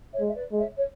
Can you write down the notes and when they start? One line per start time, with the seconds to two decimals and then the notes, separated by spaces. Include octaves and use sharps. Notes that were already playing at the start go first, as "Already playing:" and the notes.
0.13 C#5 E5
0.20 G#3
0.27 E5
0.35 B4 D5
0.52 G#3
0.59 C#5 E5
0.78 C#5